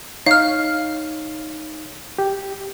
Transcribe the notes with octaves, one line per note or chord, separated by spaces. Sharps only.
D#4 C#5 F5 F6
G4